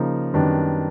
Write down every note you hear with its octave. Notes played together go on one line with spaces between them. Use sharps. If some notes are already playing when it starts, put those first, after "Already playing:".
Already playing: C#3 F3 A#3 D#4
F#2 D#3 G3 B3 D4